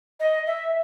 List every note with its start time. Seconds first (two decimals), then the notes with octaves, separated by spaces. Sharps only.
0.20 D#5
0.46 E5